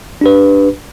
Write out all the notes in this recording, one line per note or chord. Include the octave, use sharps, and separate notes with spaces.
D4 G4 B4